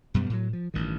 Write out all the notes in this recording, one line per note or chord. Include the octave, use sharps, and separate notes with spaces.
F#2 B2 G3 B3
A2 F#3
F3
A1 G2 D#3